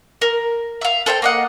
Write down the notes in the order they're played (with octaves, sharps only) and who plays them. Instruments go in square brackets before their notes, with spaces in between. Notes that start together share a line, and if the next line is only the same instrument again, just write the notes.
[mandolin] A#4
E5 F5
A4 C5 E5 G5
A#3 D#5 F#5